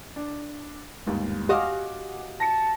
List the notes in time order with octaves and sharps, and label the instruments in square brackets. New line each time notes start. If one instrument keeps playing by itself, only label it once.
[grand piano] D4
G1 D#2 G#2
[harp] F#4 D#5 F5 [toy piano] G4 [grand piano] F#5 G#5 D6
[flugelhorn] A5 [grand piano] A#6 C#7